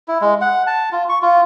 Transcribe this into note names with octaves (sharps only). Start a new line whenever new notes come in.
E4
G#3
F#5
A5
F4
C#6
F4